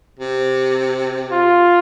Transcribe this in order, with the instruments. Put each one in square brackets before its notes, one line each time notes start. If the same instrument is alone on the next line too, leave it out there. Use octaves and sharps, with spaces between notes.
[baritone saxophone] C3
[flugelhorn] F4